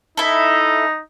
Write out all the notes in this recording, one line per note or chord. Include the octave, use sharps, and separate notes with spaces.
D#4 E4 A4